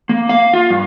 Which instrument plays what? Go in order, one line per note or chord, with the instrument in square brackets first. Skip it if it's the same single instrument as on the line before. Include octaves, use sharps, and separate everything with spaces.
[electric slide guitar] A#3
F5
F4
G2